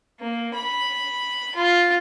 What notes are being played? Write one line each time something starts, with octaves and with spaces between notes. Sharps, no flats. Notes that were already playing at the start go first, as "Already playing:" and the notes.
A#3
B5
F4